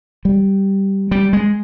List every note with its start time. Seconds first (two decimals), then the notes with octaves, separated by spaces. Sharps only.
0.25 G3
1.11 G3
1.33 G#3